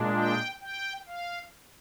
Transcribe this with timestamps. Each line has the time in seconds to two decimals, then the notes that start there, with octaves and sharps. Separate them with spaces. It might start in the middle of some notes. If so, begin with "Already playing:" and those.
Already playing: A#2 G#3 D4
0.16 G5
0.61 G5
1.07 F5